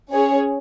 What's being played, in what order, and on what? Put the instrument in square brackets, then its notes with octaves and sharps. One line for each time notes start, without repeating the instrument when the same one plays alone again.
[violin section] C#4 G#4 C#5